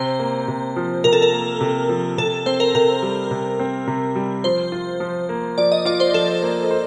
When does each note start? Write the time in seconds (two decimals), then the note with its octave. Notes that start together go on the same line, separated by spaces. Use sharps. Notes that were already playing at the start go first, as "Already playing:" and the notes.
Already playing: C3 C5
0.19 A#3
0.48 C3
0.76 F3
1.04 C3 A#4
1.13 A4
1.22 A#4
1.33 A#3
1.61 C3
1.89 F3
2.18 C3 A4
2.46 C4 C5
2.60 A#4
2.75 C3 A#4
3.02 G3
3.31 C3
3.59 C4
3.87 C3
4.16 G3
4.44 F3 C5
4.72 F4
5.00 F3
5.29 A#3
5.58 F3 D5
5.72 D#5
5.85 F4 D5
6.00 C5
6.14 F3 A4
6.42 A#3
6.71 C5